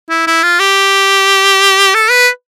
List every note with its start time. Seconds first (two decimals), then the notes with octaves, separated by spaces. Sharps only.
0.10 E4
0.27 E4
0.43 F4
0.60 G4
1.95 A4
2.11 B4